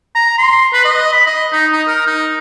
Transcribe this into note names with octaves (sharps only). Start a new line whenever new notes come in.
A#5
C6
B4
D#5
B5
D#5
D#4
D#4
A#4
D#4